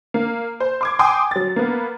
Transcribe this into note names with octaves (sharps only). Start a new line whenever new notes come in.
A#3
C5
C6 D6 G#6
G5 G#5 C6 D6 D#6
F#3 A6
A#3 B3